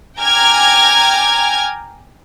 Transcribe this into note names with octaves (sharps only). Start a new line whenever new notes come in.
G5 G#5 A#5 D6 F6 G#6